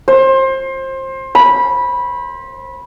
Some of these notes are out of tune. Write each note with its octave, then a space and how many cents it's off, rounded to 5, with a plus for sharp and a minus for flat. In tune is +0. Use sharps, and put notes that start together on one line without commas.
C5 +25
B5 -15